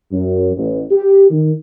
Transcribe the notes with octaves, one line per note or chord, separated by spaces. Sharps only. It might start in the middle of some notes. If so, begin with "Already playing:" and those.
F#2
A1
G4
D#3